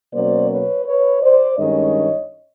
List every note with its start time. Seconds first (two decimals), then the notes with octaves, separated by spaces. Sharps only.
0.13 B2 F#3 A#3 C#4 C5 D5
0.50 B4 C#5
0.85 B4 C#5
1.21 C5 D5
1.58 G2 D#3 G#3 C#4 C#5 D#5